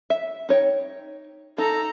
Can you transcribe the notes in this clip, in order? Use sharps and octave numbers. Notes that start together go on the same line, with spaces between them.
E5
D#4 C#5 G5
D#4 A4 A#5